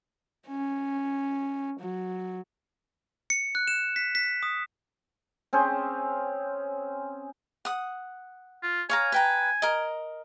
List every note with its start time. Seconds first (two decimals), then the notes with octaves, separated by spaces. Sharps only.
0.48 C#4
1.80 F#3
3.30 C#7
3.55 F#6
3.67 E7
3.96 B6
4.15 B6
4.43 D#6
5.53 C4 C#4 G#4 C5
7.65 F#5 D#6
8.63 F4
8.90 C#5 F5 G#5 A#5
9.12 B4 G5 A#5
9.62 A#4 D#5